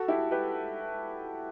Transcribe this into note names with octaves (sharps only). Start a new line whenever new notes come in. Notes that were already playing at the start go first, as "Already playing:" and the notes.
Already playing: F#4 A4
E4 G4
G4 B4